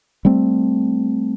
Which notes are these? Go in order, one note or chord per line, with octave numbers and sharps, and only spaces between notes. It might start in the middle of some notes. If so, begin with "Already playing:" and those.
G3 A3 C4